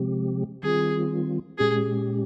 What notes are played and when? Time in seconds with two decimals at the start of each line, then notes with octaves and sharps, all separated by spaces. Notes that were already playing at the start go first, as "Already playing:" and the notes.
Already playing: C3 F3 G#3 C4 G4
0.63 D#3 G3 C4 F4 G#4
1.58 A#2 G#3 C#4 G4 G#4